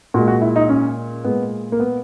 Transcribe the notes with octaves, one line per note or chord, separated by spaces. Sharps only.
A#2 G#3 F#4
F#4
E4
D#4
C#4
A#2 G#3 B3
A#3
B3